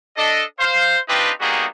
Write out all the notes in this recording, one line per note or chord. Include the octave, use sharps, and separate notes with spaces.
D4 A4 D#5
C5 F5
C4 D4 D#4 F4 G4 B4
G3 A#3 B3 D#4 F#4 G#4